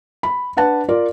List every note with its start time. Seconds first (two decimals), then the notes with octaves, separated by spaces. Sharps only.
0.23 B5
0.57 D4 B4 F#5 A5
0.89 F4 A#4 D5